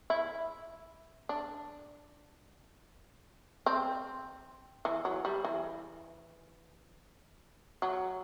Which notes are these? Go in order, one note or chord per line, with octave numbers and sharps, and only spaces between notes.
E4
D4
C4
E3
F#3
G3
E3
F#3